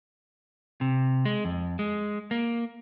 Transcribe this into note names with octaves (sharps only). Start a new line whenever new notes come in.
C3
G#3
F2
G#3
A#3